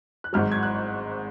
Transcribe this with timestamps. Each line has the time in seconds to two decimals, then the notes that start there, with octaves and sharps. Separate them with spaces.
0.24 F#6
0.33 G#1 G#2 F#3 F6
0.52 G#6
0.63 F#6